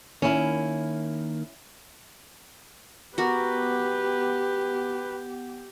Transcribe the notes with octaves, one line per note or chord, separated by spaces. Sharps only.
D#3 A#3 C#4 E4
B3 F#4 G4 A#4 B4 F#5 D6